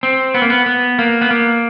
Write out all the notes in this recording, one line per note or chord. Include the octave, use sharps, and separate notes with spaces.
C4
B3
A#3
B3
B3
A#3
B3
A#3